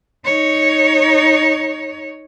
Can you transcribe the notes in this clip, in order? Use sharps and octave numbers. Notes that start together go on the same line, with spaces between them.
D#4 C#5